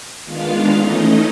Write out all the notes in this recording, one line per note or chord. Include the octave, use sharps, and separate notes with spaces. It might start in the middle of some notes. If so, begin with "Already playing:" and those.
D#3 G#3 B3 D4 F4 F5
E3 A3 C#4 D#4 D#5